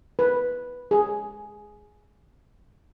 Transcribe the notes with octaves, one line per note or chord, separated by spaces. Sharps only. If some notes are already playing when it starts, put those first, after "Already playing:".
B4
G#4